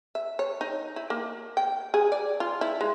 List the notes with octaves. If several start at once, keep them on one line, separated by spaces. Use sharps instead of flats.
E5
C#5
D#4
E4
A#3
G5
G#4
D5
F4
E4
G#3